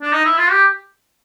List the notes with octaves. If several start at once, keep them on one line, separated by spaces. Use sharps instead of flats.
D4
D#4
E4
F4
G4